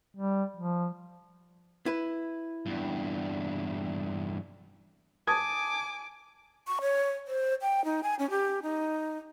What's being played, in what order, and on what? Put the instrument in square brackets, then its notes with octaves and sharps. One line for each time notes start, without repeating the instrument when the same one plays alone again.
[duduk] G3
F3
[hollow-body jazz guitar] E4 B4
[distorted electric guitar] E2 G2
[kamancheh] G#5 D6 [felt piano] A5 D#6 G#6
[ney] C#6
C#5
C5
G5
D#4
G#5
C#4
G4
D#4